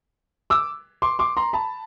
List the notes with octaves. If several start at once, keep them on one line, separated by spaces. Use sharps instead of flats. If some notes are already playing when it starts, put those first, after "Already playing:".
D6 E6
C6 D6
C6 D6
A#5 C6
A5 B5